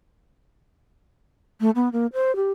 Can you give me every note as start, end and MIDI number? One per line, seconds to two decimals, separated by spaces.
1.61 1.70 57
1.76 1.89 59
1.93 2.07 58
2.13 2.35 72
2.36 2.52 67